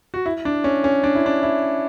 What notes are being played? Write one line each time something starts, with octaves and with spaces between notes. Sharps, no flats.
F#4
E4
D4
C#4
C#4
D4
E4
D4
E4